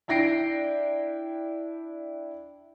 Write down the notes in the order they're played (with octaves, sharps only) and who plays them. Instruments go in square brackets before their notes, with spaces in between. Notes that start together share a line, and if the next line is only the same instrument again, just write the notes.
[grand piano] D4 E4 G5 A#6 C7 D7